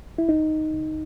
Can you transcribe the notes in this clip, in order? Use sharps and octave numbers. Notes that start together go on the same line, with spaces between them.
E4
C#2 D#4
C#2